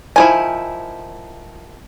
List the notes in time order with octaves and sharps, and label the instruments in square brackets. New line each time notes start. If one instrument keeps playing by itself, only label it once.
[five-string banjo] D#3 F3 E4 [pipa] G#5